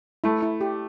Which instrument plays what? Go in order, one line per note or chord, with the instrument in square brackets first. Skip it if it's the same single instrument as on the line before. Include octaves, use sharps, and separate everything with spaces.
[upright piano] A3 [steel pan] E4
[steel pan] E4
G4